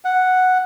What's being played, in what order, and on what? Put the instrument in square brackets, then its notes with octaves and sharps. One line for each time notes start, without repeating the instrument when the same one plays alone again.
[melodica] F#5